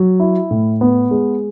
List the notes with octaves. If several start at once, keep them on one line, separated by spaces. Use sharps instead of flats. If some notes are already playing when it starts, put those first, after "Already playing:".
Already playing: F#3
E4
A2
B3
G#3